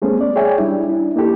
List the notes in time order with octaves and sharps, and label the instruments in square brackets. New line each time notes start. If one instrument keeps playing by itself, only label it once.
[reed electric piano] G3 A3 B3 C#4 G#4 C5
D5
G#4 C#5 D5 E5 G5 G#5
G3 D4 E4
D4 E4
A#3 D#4 E4 G4 A4